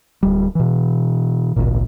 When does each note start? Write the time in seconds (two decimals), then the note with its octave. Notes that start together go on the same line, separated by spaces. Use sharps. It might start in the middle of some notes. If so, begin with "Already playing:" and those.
0.23 D1 G3
0.55 B2 E3
1.56 G#1 C#2 A#2